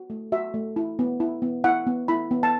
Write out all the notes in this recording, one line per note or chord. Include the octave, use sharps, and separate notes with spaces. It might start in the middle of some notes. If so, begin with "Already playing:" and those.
Already playing: F#4
A3
F#4 E5
A3
E4
B3
E4
B3
E4 F#5
B3
E4 B5
B3
A5